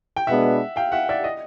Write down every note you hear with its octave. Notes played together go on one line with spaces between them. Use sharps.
G5
B2 G#3 B3 D4 E5 F#5
F5 G5
E5 F#5
D5 E5
D#5